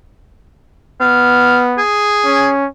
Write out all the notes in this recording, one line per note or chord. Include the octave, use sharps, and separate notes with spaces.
B3 F5
G#4
C#4